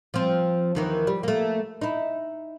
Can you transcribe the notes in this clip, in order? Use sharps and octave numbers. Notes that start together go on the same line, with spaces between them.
F3 C4
D#2 D#3 E3
G3
A3 A#3
D#4 E4